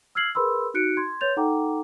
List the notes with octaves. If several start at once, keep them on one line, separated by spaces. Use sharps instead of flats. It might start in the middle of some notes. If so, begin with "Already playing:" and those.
E6 F6 G#6 C7 F#7
G#4 A#4 B4 B5 C6 E6
D#4 F#4 F#6 C#7 D7
C6 G#6
B4 C#5 C6 G6 A6 F7
D#4 A4 F#5 G5 A#5 D6